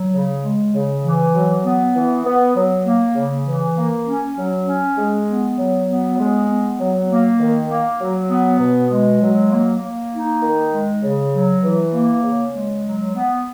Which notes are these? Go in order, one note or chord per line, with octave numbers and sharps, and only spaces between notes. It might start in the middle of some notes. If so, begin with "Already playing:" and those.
Already playing: F#3
C#3
G#3
C#3
E3
F#3
B3
E3
B3
F#3
A#3
C#3
E3
A#3
C#4
F#3
C#4
G#3
B3
F#3
B3
G#3
B3
F#3
A#3
D#3
A#3
F#3
B3
B2
G#3
F#3
A#3
A#3
D#4
D#3
G#3
C#3
F#3
E3
A#3
C#3
G#3
F#3
B3